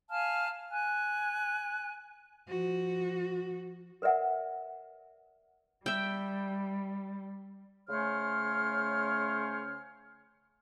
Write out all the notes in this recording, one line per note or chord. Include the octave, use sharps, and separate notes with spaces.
F5 G#5 A5 F6
G#5 F#6
F3 F#4
A#4 B4 D5 E5 F#5
G3 E5 G5
C#3 A3 C#4 C5 C#5 F6